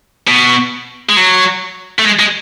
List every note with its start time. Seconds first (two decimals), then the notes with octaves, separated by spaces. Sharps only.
0.28 B2
1.09 G#3
1.17 F#3
1.99 A3
2.05 G#3
2.20 G#3